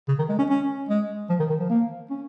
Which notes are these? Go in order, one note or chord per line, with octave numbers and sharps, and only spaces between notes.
C#3
D#3
G#3
C#4
C#4
G#3
F3
D#3
D#3
F3
A#3
C#4